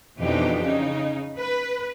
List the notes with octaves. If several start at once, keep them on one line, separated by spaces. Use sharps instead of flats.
F2 B2 E3 D4 D#4 G4
C#3 D#4
B4